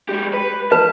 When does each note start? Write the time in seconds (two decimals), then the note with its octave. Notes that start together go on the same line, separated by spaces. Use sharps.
0.09 G#3 G4
0.34 B4
0.72 B4 A5